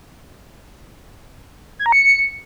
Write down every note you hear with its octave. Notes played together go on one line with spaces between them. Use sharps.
G#6
A#5
C#7